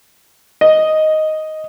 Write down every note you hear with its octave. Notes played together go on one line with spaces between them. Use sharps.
D#5